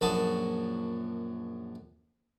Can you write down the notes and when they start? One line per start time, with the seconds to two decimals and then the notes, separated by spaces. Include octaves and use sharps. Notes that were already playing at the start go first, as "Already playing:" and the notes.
0.01 A#1 F#2 F#4 A5 D#6